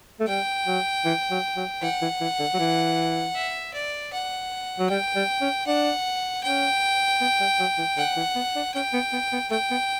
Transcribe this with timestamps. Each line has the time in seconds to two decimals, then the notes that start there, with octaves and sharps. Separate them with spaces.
0.20 A3
0.28 G3 G5
0.67 F#3
1.05 E3
1.31 F#3
1.56 F#3
1.82 E3 F#5
2.02 E3
2.21 E3
2.40 D3
2.54 F#3
2.59 E3
3.36 E5
3.74 D5
4.13 F#5
4.79 F#3
4.90 G3 G5
5.16 G3
5.41 C#4
5.67 D4 F#5
6.43 C#4 G5
7.21 B3
7.40 G3
7.60 F#3
7.78 E3
7.97 D3 F#5
8.17 E3
8.35 B3
8.56 D4
8.75 C#4 G5
8.94 B3
9.13 B3
9.32 B3
9.51 A3 G5
9.71 B3